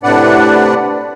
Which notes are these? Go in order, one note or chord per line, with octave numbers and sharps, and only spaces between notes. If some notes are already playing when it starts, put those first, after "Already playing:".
A2 C3 D4 B4 D5 F#5